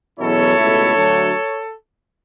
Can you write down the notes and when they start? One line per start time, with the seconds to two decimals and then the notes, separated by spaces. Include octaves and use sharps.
0.19 E2 B2 F#3 C#4 E4 A4 C#5
0.57 C#2 B2 A3 E4
0.94 D2 D3 F#3 A3 D4